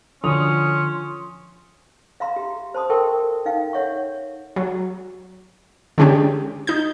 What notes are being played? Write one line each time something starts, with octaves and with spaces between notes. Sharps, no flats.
D3 F3 C#4 C6 D#6 F7
E5 F5 A#5 C6
G4
C5 A5 C6 D#6
A4 A#4 E5 G5 A5 C#6
D#4 F5 G5
C#5 E5 F#5 C#6
F#3
D3 G#3 C#4 D4 G4
D#4 G6